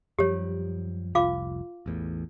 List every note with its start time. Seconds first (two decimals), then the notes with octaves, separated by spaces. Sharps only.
0.19 F#2 F3 G3 G4 C#5
1.15 F1 C2 F4 F5 D6
1.86 A1 E2 A2